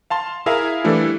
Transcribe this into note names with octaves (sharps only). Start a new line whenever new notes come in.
F5 A5 C6
E4 G#4 A#4 E5 F5 G#5
E3 G3 A3 D4 E4